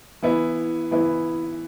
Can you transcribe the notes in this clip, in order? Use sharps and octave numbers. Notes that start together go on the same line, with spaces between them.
E3 B3 E4
E3 B3 E4